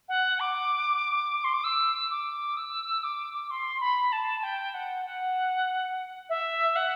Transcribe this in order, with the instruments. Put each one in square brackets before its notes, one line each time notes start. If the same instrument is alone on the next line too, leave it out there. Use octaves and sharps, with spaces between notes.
[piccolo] F#5
D6
C6
D6
E6
D6
E6
D6
C6
B5
A5
G5
F#5
F#5
E5
F#5